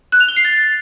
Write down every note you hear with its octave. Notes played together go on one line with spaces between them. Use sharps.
F#6
F7
G7
C7
A6